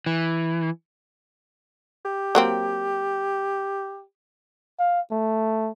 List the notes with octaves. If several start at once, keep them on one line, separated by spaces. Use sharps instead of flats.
E3
G4
F#3 A#3 C4
F5
A3